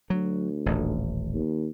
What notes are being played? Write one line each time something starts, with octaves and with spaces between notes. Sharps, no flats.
D2 F#3
D#1 A1
D#2